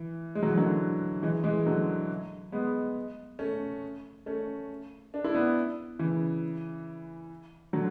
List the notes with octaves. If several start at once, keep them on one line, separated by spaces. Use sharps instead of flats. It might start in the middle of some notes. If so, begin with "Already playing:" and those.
Already playing: E3
G#3
F#3
E3
D3 F#3
E3 G#3
E3 G#3
D3 F#3
G#3 B3
A3 C#4
A3 C#4
D4
E4
B3 D4
C#3 E3
D3 F#3